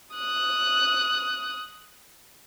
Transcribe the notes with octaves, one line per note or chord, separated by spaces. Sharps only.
D#6 F#6